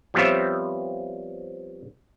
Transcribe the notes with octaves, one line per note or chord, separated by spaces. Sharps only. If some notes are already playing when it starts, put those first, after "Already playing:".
F3 G3 B3 C4 C#5 E5